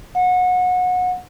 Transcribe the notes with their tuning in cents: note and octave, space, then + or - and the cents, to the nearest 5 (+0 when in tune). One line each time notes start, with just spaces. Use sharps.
F#5 -25